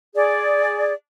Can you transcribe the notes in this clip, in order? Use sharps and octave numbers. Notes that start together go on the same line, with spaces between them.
G#4 D5